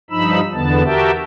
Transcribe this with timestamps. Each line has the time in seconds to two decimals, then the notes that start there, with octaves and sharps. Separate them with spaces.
0.11 G2 F3 D#4 B5 E6
0.53 E2 D3 B3 A5
0.85 F#4 G4 A#4 E5 G5 A5